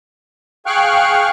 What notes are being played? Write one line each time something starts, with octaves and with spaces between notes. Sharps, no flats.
G#4 F5 G5 C#6 F6 F#6